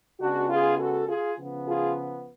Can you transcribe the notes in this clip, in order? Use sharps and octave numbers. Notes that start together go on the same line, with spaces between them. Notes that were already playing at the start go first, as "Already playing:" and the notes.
C#3 G#3 B3 D4 F#4
F4 G#4
F#4 A4
F4 G#4
C#3 F3 B3
F4 G#4